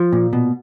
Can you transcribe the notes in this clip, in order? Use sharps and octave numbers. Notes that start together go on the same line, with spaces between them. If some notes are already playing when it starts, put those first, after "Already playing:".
Already playing: F3
A#2
B2